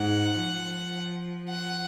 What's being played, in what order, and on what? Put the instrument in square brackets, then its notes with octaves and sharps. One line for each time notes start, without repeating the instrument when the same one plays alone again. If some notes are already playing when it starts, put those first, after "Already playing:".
Already playing: [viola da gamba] G#2 [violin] F#5
[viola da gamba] F3
[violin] F#5